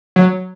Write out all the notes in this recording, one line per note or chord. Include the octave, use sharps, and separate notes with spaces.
F#3